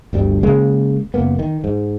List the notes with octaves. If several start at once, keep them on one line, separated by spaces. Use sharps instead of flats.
G1 D2 G3
C#3 G#3 A#3
F#1 A#3 B3
D#3
G#2